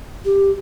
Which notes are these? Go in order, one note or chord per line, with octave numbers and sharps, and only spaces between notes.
G4